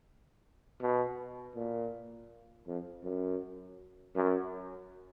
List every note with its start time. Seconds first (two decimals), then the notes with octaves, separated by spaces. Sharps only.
0.81 B2
1.55 A#2
2.67 F2
3.04 F#2
4.15 F#2